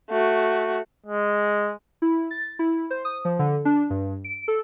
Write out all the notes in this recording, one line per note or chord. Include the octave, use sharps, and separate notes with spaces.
A3 F#4
G#3
E4
A6
E4
C5
D#6
F3
D3
D4
G2
D7
A4